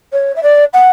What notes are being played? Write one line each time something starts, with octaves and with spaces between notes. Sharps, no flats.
C#5
E5
D5
F#5